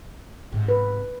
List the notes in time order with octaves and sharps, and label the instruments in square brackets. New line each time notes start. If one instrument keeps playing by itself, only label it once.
[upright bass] G#2 C3
[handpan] B4